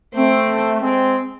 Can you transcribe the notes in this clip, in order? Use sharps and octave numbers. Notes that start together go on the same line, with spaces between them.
A3 C4
G#3 C4